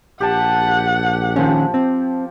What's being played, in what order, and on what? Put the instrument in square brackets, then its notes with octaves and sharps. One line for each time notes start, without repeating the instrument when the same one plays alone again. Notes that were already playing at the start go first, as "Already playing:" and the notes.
[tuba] A#1 [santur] G4 A5 [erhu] F#5
[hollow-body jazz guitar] D#3 C#4 [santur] F3
[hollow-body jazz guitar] C4